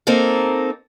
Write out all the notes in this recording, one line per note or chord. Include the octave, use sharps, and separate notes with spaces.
A#3 C4 D#4 A4